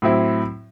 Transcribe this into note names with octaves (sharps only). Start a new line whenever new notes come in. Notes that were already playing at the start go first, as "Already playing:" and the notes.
A2 F#3 C4 E4